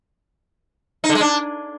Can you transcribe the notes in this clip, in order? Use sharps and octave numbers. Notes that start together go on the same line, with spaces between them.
D#4
D3
G#3
D4